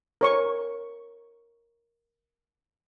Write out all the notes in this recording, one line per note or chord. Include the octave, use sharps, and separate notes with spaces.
A#4 C#5 C#6